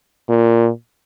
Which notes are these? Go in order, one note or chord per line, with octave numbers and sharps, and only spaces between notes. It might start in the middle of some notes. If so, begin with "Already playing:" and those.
A#2